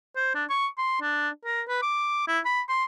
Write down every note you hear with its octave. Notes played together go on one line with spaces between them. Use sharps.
C5
D4
C#6
C6
D4
A#4
B4
D6
E4
B5
C6